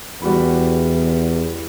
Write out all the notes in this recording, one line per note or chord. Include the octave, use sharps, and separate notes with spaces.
E2 G3 F#4 B5